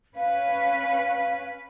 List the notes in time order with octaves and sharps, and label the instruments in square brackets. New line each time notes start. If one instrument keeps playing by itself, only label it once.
[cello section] C#4 B4 [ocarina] F5